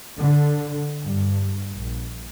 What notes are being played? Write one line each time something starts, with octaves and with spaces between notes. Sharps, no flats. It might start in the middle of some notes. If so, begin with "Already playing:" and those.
D3
G2
A#1